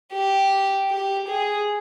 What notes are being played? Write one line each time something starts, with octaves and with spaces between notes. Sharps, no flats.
G4
G4
G#4